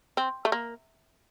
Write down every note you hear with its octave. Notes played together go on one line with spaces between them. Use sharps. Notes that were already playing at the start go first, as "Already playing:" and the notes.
C4
A3
A#3